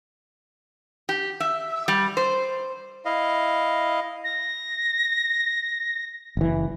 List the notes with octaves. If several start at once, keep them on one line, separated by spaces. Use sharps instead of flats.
G4
E5
G3
C5
E4 D#5 F5
A#6
F#1 E3